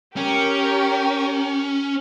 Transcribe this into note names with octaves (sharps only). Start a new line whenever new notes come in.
C#4 G4 A#4